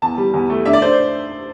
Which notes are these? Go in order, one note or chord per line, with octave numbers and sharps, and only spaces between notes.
E2 A5
G3
E2
A3
D4 E5
D5
D4 C5